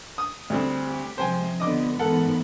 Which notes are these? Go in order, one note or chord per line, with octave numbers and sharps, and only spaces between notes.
D#6
D2 G3 C4
G4
C3 F3 G#3 C5 G5 G#5
D3 F3 B3 D#5 D6
G#2 E3 B3 A4 A#4 F#5